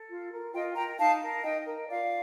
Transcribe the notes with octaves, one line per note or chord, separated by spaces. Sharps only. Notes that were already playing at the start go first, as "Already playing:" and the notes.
Already playing: A4
F4
A#4
F4 D#5 G5
A#4 G5 A#5
D#4 F5 A5
A#4
D#4 D#5 G5
A#4
F4 D5 F5